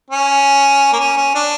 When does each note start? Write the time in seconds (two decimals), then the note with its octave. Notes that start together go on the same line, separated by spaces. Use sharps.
0.10 C#4
0.93 A#3
0.99 C#4
1.17 C#4
1.35 D4